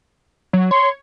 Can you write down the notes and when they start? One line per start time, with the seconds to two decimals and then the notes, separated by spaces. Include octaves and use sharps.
0.53 F#3
0.71 C#5 C6